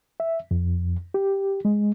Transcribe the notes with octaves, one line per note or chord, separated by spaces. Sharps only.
E5
F2
G4
G#3